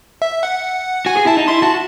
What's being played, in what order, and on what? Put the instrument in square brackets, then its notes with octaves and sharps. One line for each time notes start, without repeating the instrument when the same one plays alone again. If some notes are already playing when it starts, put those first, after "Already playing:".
[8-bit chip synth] E5
F#5
[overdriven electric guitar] F#4 [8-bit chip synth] G#5
[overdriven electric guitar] G#4
[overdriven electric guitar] E4 [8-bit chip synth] A5
[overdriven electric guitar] D#4
[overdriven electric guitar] E4 [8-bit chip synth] C6
[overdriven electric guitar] F#4 [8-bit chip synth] A5